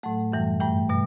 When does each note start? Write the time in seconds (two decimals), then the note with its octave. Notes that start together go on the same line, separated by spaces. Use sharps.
0.03 A2 F#3 A3 F#5
0.32 F#2 E3 G3
0.60 G2 E3 A3 G5
0.89 B2 G3